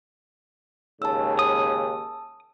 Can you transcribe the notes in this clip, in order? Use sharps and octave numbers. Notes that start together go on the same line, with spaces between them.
D#2 G#2 C#3 A5 E6
D#6